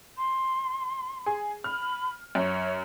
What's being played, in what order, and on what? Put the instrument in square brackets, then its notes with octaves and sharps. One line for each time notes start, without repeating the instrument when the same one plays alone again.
[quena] C6
[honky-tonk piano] G#4
[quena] B5 [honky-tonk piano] F6
[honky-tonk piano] F#2 [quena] C#5